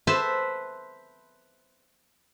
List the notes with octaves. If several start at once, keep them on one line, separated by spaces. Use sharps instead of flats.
B4 C5 E5 A5 C6